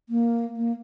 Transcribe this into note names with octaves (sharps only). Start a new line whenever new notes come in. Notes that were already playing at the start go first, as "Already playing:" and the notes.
A#3
A#3